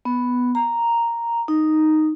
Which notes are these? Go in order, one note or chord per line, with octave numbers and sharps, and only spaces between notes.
B3
A#5
D#4